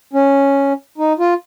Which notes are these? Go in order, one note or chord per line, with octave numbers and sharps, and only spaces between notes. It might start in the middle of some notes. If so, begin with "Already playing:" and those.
C#4
D#4
F4